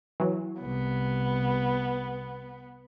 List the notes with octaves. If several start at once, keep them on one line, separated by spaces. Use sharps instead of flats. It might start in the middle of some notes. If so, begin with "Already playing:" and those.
E3 F#3
C2 B3